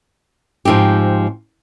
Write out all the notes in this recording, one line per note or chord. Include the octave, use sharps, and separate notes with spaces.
G#2 F3 C4 D#4 G4